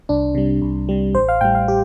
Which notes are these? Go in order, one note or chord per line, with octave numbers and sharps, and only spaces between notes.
C2 D4
C3 G3
C2
C3 G3
A1 C5
F5
A2 G3 G5
F5
G4